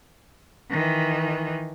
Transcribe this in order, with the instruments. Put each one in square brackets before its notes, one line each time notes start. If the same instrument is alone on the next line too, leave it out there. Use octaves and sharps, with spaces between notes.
[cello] D#3 E3